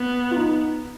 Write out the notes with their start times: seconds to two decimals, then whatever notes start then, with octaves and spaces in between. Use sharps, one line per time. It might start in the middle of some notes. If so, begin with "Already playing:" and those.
Already playing: B3
0.31 F4
0.36 D#4